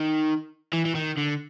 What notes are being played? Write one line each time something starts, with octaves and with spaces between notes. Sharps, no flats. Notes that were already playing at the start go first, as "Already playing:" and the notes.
Already playing: D#3
E3
E3
D#3
D3